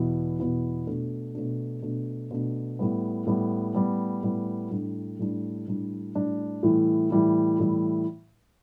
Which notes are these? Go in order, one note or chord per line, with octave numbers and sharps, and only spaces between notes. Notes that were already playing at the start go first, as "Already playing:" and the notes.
Already playing: E2 B2 B3 E4
E2 B2 B3 E4
B2 A3 D4
B2 A3 D4
B2 A3 D4
B2 A3 D4
A2 G3 B3
A2 G3 B3
A2 G3 B3
A2 G3 B3
A2 G3 D4
A2 G3 D4
A2 G3 D4
A2 G3 D4
A2 E3 G3 E4
A2 E3 G3 E4
A2 E3 G3 E4